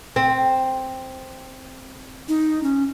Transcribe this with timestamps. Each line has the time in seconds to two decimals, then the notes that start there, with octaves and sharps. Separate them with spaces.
0.16 C4
2.28 D#4
2.63 C#4